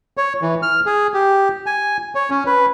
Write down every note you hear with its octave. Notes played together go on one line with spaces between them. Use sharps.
C#5
E3
F6
G#4
G4
G#5
C#5
C#4
B4